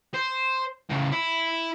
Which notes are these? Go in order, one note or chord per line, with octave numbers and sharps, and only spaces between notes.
C5
A2 C#3
E4